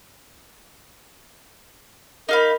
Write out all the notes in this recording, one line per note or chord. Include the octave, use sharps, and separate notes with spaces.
D#4 A#4 F5 B5